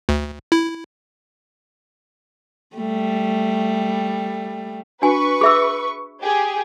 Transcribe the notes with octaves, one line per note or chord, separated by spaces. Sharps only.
D2
E4
G3 A3
D4 F#4 B4 G#5 C#6
G#4 E5 E6
G4 G#4